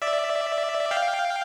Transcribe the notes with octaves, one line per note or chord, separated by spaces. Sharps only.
D5 E5
F5 G5